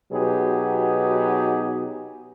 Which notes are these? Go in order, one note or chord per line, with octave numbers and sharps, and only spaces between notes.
B2 F#3 B3 D#4 G4 G#4